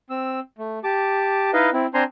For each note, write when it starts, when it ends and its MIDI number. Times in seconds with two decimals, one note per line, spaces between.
0.10 0.40 60
0.10 0.40 88
0.58 0.79 57
0.84 1.51 67
0.84 1.51 81
0.84 1.51 86
1.53 1.70 63
1.53 1.70 64
1.53 1.70 71
1.53 1.70 75
1.53 1.70 77
1.73 1.86 60
1.73 1.86 64
1.94 2.03 60
1.94 2.03 62
1.94 2.03 72
1.94 2.03 80
1.94 2.03 82
1.94 2.03 84